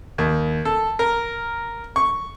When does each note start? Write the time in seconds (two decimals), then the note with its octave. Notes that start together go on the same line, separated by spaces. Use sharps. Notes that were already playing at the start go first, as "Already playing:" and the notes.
0.18 D#2
0.65 A4
0.99 A#4
1.96 C#6